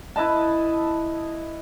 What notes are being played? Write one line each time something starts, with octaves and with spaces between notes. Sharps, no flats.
E4 B4 D#5 A5